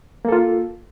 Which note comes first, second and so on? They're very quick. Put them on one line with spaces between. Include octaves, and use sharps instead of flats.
A#3 A4 F4